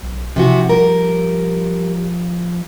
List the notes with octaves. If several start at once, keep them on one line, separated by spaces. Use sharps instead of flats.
B1
C3 E3 F3 F#4
G3 A#4